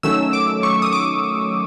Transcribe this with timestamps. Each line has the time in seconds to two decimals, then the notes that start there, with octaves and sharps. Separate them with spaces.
0.03 D#3 F#3 A3 C#4 E6
0.33 D6
0.63 C#6
0.82 D#6
0.93 D6